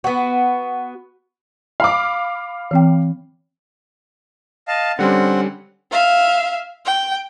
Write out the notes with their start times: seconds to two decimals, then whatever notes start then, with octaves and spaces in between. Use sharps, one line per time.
0.04 B3 F#4
1.80 F5 B5 D6
2.71 E3 C4 G5
4.68 D#5 F5 A5
4.99 D3 G3 C4 C#4 F#5
5.92 E5 F5
6.85 G5